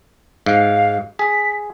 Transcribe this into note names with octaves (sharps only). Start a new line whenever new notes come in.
G#2 F5
G#4 B6